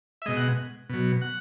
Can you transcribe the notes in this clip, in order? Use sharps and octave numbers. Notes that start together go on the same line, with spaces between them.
E5
B2 G#3 D#5
F#5
B2 F#3
F#5